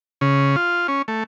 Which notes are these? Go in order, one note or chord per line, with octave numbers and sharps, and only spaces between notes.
C#3
F4
C#4
A3